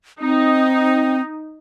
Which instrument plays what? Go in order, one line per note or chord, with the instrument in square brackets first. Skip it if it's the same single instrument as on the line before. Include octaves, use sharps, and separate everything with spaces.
[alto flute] C4 [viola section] D#4